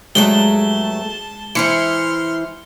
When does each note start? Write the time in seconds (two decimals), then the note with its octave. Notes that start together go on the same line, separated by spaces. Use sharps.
0.15 G2 F#3 G#3 A3 A5 G7
1.55 E3 E4 C5 C6 F6 C#7